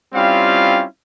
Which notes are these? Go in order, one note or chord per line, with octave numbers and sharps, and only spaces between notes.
G3 C4 C#4 E4 F4 F5